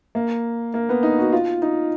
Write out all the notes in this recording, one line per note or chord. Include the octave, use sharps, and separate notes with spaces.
A#3
A#3
B3
D#4
F#4
F4
D#4